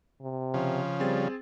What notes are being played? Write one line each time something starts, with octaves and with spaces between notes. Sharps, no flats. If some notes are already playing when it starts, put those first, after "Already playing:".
C3
C#3 F3
G3 C4 G#4 A6